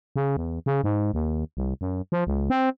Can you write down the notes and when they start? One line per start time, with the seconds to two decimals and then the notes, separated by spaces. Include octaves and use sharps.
0.16 C#3
0.37 E2
0.66 C#3
0.84 G#2
1.14 D#2
1.57 C2
1.81 F#2
2.12 F3
2.27 C#2
2.50 C4